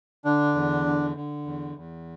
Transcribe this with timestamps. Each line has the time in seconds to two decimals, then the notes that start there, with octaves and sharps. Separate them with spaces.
0.24 D3 D4
0.55 E2
0.85 D3
1.16 D3
1.46 E2
1.76 E2